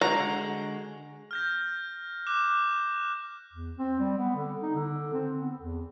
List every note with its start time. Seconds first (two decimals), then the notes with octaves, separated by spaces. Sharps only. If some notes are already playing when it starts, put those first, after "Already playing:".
0.01 D3 G#3 F#4 A#5
1.31 F6 G6 A#6
2.27 D6 F#6 E7
3.53 E2
3.78 C4
4.00 G3
4.18 B3
4.36 D3
4.62 D#4
4.75 D3
5.13 C4
5.39 B3
5.59 E2